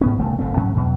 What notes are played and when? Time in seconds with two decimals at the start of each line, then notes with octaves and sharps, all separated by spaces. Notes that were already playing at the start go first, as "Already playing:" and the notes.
0.01 G#2 B3 C#4
0.19 D#1 C2 A3
0.39 F#1 A2 A3 C4
0.57 G#2 F#3 C#4
0.76 E2 B2 F#3